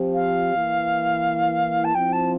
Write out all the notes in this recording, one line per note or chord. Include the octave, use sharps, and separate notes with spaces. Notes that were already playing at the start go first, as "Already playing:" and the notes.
Already playing: F3 C4 G4
F5
E3 A#3 E4
A5
F3 C4 E4 G5
A5